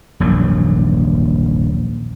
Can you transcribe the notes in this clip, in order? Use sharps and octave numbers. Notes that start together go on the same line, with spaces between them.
D#1 A#1 F#2 F#3